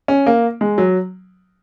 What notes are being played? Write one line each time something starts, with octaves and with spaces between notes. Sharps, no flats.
C#4
A#3
G#3
F#3